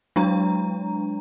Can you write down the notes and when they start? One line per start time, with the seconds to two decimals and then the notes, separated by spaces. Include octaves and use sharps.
0.16 F#3 G#3 D4 A#5